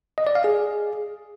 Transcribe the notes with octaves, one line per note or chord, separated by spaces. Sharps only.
D#5
D5
F5
G#4